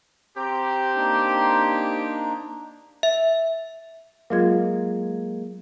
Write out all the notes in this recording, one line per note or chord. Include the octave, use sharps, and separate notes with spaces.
C4 G4 A#5
A#3 D4 D#4
E5
F#3 G#3 A#3 F4 G#6